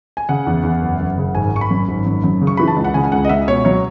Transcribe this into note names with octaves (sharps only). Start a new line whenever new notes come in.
G#5
C#3 F#5
E2
E2
F#1
F#1
C#3
G#1 G#5
G#1 C#6
B5
F#2
G#1
F#2
F#2
C#3
C#6
E3 B5
A5
C#2
F#5
C#3 G#5
C#2 F#5
D#5
C#2 E5
B2 C#5
F#3 C#5